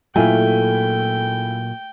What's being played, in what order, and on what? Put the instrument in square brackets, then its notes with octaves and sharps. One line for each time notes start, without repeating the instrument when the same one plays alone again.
[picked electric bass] A#2 F#3 [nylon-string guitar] A3 [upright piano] E4 F4 G#5 [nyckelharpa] G5